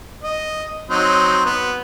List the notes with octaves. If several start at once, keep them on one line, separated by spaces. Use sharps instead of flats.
D#5
F#3 C4 D#4
B3